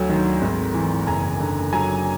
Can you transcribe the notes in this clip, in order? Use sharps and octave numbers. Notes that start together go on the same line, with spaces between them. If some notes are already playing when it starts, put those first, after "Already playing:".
Already playing: D2 F#3
D#3
G#1
E3
F#1 G#5 A#5
D3
F#3 G#5 A#5